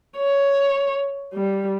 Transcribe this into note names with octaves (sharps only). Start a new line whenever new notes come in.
C#5
G3